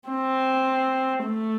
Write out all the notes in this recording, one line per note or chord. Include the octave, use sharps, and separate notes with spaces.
C4
A3